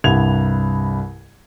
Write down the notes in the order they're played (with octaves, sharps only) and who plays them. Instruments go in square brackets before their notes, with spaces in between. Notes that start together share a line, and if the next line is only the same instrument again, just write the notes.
[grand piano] C2 G2 F#5 G#6 F7